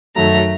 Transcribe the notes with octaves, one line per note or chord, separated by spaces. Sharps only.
F#2 D#3 F#3 A3 A#5